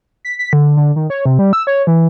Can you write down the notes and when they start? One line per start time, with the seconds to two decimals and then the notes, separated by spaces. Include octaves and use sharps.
0.25 B6
0.39 B6
0.53 D3
0.77 D3
0.96 D#3
1.10 C#5
1.26 C3
1.39 G3
1.53 E6
1.67 C#5
1.87 E3